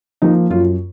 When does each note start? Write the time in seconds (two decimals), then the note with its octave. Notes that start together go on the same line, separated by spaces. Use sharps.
0.22 F3 A#3 D#4
0.50 F#2 F4